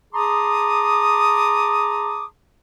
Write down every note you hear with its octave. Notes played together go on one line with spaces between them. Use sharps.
G#4 A5 A#5 C6 D6 D#6